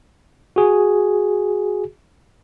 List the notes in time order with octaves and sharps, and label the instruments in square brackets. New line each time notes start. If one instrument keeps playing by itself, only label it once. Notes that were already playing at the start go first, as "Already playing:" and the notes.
[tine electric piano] F#4 G#4